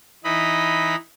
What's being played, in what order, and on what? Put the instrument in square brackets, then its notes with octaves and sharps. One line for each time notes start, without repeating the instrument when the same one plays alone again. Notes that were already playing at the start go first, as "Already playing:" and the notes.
[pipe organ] E3 D#4 D#5 B5